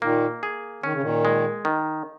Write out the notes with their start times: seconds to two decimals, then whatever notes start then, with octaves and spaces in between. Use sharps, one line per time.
0.02 A#2 D#3 A#3
0.43 G#4
0.84 D#3 C#4
0.92 C#3
1.02 A#2 D#3
1.25 G#3
1.65 D#3